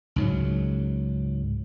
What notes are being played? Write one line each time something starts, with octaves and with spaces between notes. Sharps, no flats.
C#2 G#2 F#3